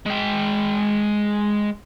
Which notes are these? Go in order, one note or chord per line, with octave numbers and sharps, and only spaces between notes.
G#3 G5